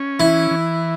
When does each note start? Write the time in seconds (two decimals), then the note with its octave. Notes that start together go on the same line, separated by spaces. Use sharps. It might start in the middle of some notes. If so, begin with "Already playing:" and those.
Already playing: C#4
0.19 E3 E4
0.51 E3